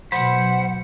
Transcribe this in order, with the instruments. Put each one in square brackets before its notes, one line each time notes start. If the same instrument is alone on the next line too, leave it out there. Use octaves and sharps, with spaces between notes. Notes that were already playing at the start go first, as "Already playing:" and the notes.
[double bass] B2 [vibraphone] F#3 [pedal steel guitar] C5 B5 [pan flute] F#5